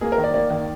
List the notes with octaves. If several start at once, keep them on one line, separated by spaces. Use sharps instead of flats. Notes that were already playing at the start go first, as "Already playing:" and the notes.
A#3 G#4
A#4
D#3
D5
A#3 D5
D#3